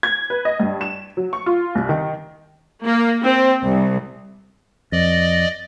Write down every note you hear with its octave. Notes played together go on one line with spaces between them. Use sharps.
G#6
B4
D#5
G2
E7
F#3
C#6
F4
C2
D#3
A#3
C4
C2
F2 D5 D#5